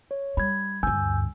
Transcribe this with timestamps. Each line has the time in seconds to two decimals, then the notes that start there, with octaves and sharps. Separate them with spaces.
0.11 C#5
0.37 G3 B5 G#6
0.83 D2 G2 G#5 E6 G6